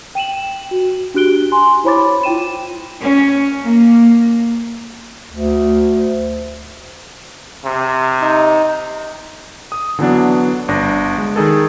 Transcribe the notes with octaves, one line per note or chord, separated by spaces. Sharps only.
G5 D#7 E7 F#7
F#4
D4 F#4 G4 F#6 D7 G7
G#5 C6
E4 C5 C#5 B5 D6 A6
E4 F4 G5 D#7 E7
C#4
A#3
D2
C3
D#4
D#6
D3 E3 F#3 B3 D4
G1 D4 A#6
G#3
D#3 D#4 G#4 A4